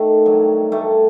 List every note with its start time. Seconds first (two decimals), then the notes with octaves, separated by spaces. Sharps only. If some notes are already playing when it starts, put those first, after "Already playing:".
Already playing: D#3 A3
0.26 G2 F#3
0.72 G2 A3